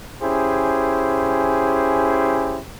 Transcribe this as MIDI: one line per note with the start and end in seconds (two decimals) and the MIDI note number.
0.23 2.59 61
0.23 2.59 64
0.23 2.59 67
0.23 2.59 68
0.23 2.59 72